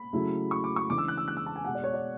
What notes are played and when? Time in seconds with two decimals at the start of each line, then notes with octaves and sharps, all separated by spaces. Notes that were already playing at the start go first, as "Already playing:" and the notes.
Already playing: B5
0.13 C#3 F#3 A3 E4
0.51 C#6
0.64 D6
0.76 C#6
0.89 C#3 E3 G#3 D4 D6
0.98 E6
1.08 F#6
1.18 E6
1.28 F#6
1.37 E6
1.46 A5
1.56 G#5
1.65 B2 G#3 B3 F#5
1.75 D5
1.84 C#5
1.94 D5